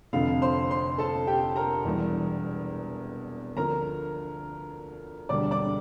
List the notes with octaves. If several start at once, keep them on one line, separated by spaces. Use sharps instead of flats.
F1 F2 D3 F3 F4 F5
C5 C6
C5 C6
A4 A5
G4 G5
A#4 A#5
E1 E2 E3 G3
D2 D3 F3 A#4 A#5
E1 D2 D3 G3 D5 D6
D5 D6